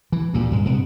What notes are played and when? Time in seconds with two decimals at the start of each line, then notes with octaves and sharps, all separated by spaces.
0.12 E3
0.33 D2 G2 A#2
0.52 G2 G#3
0.65 G2 C3 B3